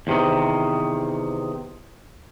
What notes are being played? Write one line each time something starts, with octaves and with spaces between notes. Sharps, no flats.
E2 C3 D#3